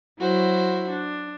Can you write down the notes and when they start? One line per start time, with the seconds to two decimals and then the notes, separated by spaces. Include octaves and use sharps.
0.19 F#3 E4 F#4 C5
0.89 D4